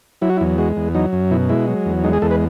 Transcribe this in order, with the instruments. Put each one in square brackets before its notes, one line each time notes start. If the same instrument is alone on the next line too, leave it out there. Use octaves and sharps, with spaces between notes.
[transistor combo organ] F#3 E4
F#4
E4
E2
G#3 F#4
E2
F#3 D#4
F#2
B2 E4
G#3 E4
F#3
E2
G#3 D#4
G#4
E2 A4
B4